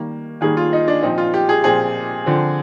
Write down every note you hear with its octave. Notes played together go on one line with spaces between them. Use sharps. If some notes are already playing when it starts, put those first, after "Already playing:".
Already playing: D#3 G3 A#3
D#3 G3 A#3 G#4
F4
D#4
D4
A#2 F3 C4 D#4
F4
G4
G#4
A#2 F3 C4 G#4
D3 F3 C4